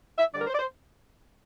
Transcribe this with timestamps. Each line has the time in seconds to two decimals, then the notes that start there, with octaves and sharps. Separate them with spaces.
0.18 E5
0.34 D3 G3 D4 D5
0.41 A#4
0.47 C5
0.53 D5
0.59 C5